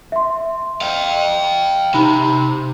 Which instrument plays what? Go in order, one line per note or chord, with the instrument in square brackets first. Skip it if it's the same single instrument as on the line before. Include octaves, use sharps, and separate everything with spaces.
[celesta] E5 C6
[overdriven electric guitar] F5 G5
[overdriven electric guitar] C3 [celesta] D#4 B5